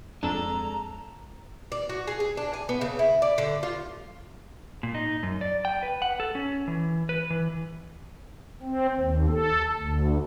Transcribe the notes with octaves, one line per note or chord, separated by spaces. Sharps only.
F2 G#3 D4 A4 A#5
D5
F#4
G#4
G#4
D4
G#5
B3
C#3
E4
D5
D3
F4
A#2
D#4
F#2
D5
G5
B4
F#5
A4
C#4
E3
B4
E3
C4
D#2
A4
D2